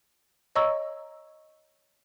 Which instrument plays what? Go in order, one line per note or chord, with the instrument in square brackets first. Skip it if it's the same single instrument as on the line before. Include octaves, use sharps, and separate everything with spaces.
[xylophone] C#5 D#5 A#5 C#6 E6